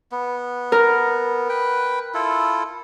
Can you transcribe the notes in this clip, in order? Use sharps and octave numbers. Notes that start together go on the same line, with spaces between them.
B3
A#4
B4 G5
E4 F4 A4